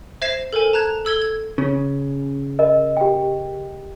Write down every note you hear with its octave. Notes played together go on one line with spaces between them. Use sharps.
C5 E5 G#6 A#6 C7 E7
A4 A#4 C5 G#5
A5 A#5 F#6 G#6
A4 E6 G#6 G7
G#6
C#3
A#4 D#5
G4 G5